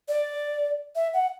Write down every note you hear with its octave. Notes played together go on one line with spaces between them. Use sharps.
D5
E5
F#5